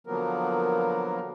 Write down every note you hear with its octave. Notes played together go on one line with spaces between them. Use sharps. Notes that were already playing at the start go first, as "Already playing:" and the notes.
D3 F3 F#3 A#3 B3 A#4